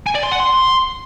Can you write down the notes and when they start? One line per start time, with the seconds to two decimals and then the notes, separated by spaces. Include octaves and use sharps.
0.06 G#5
0.15 D5
0.23 C6
0.32 F#5
0.40 C6